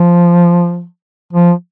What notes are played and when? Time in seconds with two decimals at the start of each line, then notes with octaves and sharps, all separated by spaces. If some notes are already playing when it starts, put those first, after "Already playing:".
Already playing: F3
1.33 F3